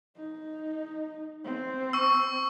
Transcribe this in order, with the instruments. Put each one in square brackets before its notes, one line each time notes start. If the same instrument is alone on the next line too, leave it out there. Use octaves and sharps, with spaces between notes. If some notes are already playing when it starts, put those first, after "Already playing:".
[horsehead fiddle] D#4
C4
[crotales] C#6 E6